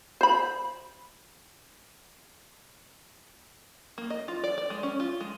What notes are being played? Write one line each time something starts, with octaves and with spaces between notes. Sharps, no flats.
C5 B5
A#3
D#5
F4
D5
D5
G#3
C#4
F4
G#3